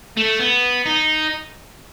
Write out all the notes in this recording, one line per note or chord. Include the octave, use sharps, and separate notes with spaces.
A3
B3
D#4